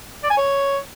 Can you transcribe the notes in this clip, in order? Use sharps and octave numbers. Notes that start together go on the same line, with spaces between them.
D5
G#5
C#5